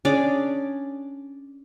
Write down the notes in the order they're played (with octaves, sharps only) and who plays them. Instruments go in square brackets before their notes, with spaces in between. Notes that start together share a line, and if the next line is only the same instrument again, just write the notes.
[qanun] C#4 D4 G#4 D5